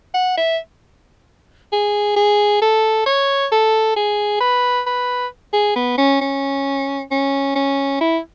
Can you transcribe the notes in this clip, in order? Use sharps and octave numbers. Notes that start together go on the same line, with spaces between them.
F#5
E5
G#4
G#4
A4
C#5
A4
G#4
B4
B4
G#4
B3
C#4
C#4
C#4
C#4
E4